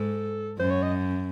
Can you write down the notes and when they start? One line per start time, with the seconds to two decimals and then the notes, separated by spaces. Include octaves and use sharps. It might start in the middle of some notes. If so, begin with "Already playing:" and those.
Already playing: G#2 A4
0.59 F#2 C5
0.71 C#5
0.83 D#5